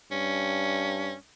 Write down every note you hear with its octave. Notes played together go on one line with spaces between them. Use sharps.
G2 C#4